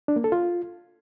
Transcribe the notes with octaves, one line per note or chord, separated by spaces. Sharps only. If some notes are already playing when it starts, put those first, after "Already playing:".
D4
A#3
A4
F4